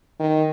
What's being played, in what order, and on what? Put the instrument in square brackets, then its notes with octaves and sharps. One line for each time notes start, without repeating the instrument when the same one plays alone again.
[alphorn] D#3